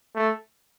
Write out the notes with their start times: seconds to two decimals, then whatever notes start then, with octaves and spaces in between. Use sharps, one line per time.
0.15 A3